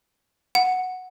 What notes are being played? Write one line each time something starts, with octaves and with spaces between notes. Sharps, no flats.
F#5